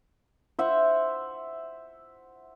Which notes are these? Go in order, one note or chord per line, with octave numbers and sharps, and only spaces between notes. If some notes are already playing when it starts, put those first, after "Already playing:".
C5 E5 F#5